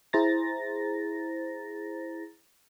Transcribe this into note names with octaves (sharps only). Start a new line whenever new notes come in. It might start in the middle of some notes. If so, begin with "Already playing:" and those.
E4 G#4 C5 A#5 A6 A#6